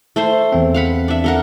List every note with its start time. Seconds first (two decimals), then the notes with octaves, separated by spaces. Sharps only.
0.16 A3 C5 C6
0.52 E2 C4
0.74 F5 F#5 B5
1.08 D4 E5
1.24 A4 A#4 F#5